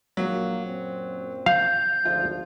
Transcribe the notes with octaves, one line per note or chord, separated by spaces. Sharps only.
A#1 F#3 A#3
F#2 A#2 C4
F5 G6
G#1 D2 F3 F4